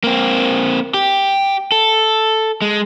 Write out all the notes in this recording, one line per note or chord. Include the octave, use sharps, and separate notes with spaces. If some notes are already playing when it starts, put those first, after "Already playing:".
A#3 C4
G4
A4
G#3